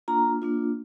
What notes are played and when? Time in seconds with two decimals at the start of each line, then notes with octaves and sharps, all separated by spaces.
0.08 A#3 D4 F4 A#5
0.42 A#3 D4 F4